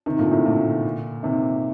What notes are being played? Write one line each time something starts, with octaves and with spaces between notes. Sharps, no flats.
C3 D#3
A#2 D3
A2 C3
A#2 D3
C3 D#3